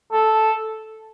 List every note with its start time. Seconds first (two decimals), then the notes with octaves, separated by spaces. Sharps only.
0.13 A4